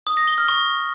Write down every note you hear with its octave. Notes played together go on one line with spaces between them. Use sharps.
D#6
A#6
G7
F6
C#6